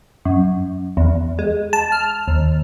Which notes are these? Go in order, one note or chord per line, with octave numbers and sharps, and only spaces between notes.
F#2
E2
G#3
A5
F6
D#2